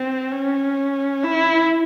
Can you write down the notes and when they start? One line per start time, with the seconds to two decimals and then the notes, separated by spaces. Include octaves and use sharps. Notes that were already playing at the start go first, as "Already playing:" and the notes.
Already playing: C4
0.32 C#4
1.24 E4